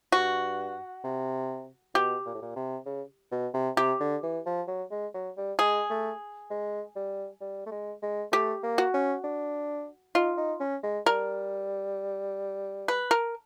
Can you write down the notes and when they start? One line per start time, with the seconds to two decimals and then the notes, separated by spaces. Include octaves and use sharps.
0.12 G2 F#4
1.04 C3
1.94 B2 G4
2.26 A#2
2.34 A2
2.42 A#2
2.56 C3
2.86 C#3
3.32 B2
3.54 C3
3.77 C3 G4
4.00 D3
4.23 E3
4.46 F3
4.68 F#3
4.91 G#3
5.14 F#3
5.37 G3
5.59 G#3 G#4
5.90 A3
6.50 G#3
6.96 G3
7.41 G3
7.66 A3
7.71 G#3
8.03 G#3
8.32 A3 G4
8.63 A#3
8.78 F#4
8.94 C#4
9.24 D4
10.15 D#4 F4
10.38 D#4
10.60 C#4
10.83 G#3
11.06 G3 A#4
12.88 B4
13.11 A#4